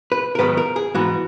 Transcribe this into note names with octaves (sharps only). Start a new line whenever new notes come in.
B4
A#4
G#2 D#3 F#3 B3 B4
A#4
G#4
G#2 E3 B3 F#4